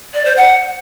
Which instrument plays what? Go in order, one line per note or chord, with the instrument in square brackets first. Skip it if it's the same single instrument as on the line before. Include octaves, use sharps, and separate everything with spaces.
[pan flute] D5
C5
F#5